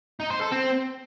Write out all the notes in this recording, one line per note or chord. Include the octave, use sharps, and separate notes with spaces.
D#4
C5
A4
C4